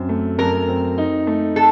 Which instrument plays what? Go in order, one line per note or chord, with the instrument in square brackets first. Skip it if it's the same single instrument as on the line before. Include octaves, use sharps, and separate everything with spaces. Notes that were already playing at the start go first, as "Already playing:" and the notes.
Already playing: [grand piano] F#2 C4
A3
[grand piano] F#2 [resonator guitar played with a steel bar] A#4
[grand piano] C4
D#4
A3
[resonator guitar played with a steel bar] A4